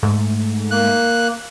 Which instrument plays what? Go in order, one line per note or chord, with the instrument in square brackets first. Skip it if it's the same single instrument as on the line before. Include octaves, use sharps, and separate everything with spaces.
[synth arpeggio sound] G#2 A3
[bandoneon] A#3 F#6